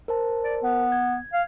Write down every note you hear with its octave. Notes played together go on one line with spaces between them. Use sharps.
A#4 C5 A5
D5
B3
G#6
F5